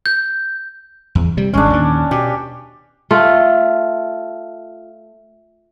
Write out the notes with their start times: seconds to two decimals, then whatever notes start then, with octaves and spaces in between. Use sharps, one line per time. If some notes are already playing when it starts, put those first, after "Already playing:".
0.06 G6
1.15 E2
1.37 C3 G3
1.54 G#1 G#3 C#4 D4
1.70 D#2 A#2
2.11 B2 G4
3.11 A3 F4